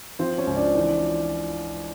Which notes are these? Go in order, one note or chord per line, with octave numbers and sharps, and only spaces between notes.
F3 C4 C5
C#4 C#5
C#2
D4 D5
E3